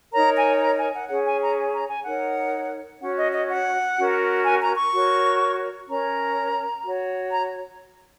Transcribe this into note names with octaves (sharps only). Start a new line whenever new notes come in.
D#4 A#4 C#5 A#5
G#5
A#5
G#5
F#5
C#4 G#4 C#5 F#5
G#5
A#5
A#5
G#5
D#4 A#4 C#5 F#5
C#4 F#4 C#5 F#5
D#5
D#5
F#5
C#4 F#4 A#4
G#5
A#5
C#6
F#4 A#4 C#5
C#4 A#4 C#5 A#5
F#4 C#5
A#5